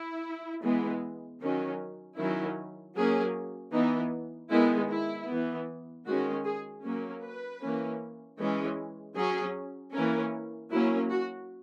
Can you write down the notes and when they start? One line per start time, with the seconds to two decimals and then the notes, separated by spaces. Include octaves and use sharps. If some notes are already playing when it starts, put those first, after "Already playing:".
Already playing: E4
0.63 E3 G#3 B3
1.40 D#3 F#3 C#4
2.17 D#3 F#3 C#4 E4
2.95 F#3 A#3 C#4 G#4
3.73 E3 B3 D#4
4.50 D#3 G#3 B3 E4
4.89 E4
5.28 E3 B3
6.06 D#3 G#3 C#4 F#4
6.45 G#4
6.83 F#3 A#3 C#4
7.21 B4
7.60 E3 A#3 C#4
8.38 E3 G#3 C#4
9.15 F#3 C#4 G#4
9.93 E3 A#3 C#4 A#4
10.70 F#3 A#3 C#4 E4
11.10 F#4